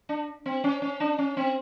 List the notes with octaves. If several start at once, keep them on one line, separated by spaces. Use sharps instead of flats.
D4
C4
C#4
C#4
D4
C#4
C4